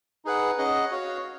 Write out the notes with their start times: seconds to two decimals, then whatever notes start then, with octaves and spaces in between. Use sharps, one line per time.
0.25 D#4 G#4 B4 F#5
0.58 C#4 G#4 D#5 F#5
0.91 F#4 C#5 F5